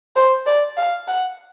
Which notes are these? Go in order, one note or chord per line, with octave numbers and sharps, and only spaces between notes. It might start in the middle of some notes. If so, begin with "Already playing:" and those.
C5
D5
F5
F#5